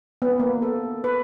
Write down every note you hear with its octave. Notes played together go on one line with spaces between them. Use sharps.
B3
A#3
A4
B4